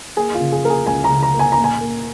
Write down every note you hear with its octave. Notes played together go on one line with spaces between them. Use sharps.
A#3 G#4
F4
C#3
G#4
A#3 A#4
G#4
C#2 G#5
A#5
C#3
A#5
A#3
G#5
A#5
A#2
G#5
A#3